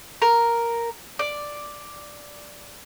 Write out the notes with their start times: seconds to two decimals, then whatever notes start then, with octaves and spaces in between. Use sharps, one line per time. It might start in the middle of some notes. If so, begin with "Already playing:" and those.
0.22 A#4
1.19 D5